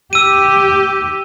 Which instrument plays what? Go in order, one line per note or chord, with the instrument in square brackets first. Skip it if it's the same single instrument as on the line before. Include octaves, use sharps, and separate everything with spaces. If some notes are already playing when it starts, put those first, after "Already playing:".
[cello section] G4 [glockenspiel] E6 D#7